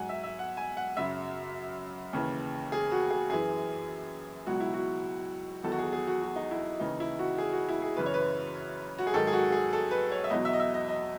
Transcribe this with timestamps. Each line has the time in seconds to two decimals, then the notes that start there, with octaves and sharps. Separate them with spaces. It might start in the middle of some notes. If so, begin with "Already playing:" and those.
Already playing: G#2 F#3 F#5 G#5
0.09 E5
0.24 E5
0.39 F#5
0.57 G#5
0.77 F#5
0.97 F#2 C#3 F#3 E5
2.13 D#2 C#3 E3
2.72 G#4
2.92 F#4
3.11 G#4
3.30 F#2 E3 G#4
4.46 C#2 B2 F#3 F#4
4.60 E4
4.74 F#4
5.63 E2 D#3 F#3 A4
5.72 F#4
5.78 G#4
5.93 G#4
6.07 F#4
6.22 F#4
6.36 D#4
6.51 E4
6.80 D#2 C#3 E3 D#4
7.00 E4
7.19 F#4
7.38 G#4
7.53 F#4
7.68 E4
7.82 G#4
7.97 F#2 C#3 E3 B4
8.06 C#5
8.14 B4
8.99 F#4
9.07 G#4
9.14 G#2 D#3 F#3 A4
9.27 G#4
9.33 F#4
9.52 G#4
9.73 A4
9.91 B4
10.11 C#5
10.24 E5
10.30 E2 B2 F#3 D#5
10.45 E5
10.53 D#5
10.60 E5
10.74 D#5
10.89 D#5